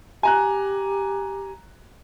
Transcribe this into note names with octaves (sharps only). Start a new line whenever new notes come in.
G4 G#5 A#5 F#6